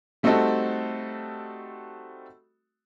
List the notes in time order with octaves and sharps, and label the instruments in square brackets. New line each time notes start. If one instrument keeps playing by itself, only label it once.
[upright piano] G3 A3 C4 D#4 F#4 A4